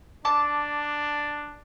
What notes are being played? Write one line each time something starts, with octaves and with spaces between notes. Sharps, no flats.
D4 A5 D6